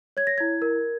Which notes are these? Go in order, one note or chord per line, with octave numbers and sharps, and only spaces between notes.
C#5 G#6
A#6
E4 G#6
A#4